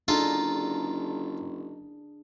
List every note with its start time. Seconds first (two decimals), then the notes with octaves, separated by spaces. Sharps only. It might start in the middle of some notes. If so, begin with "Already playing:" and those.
0.08 F#1 D4 D#4 F4 G#4 A4